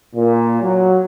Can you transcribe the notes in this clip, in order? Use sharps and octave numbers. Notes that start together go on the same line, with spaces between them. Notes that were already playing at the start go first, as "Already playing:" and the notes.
A#2
F#3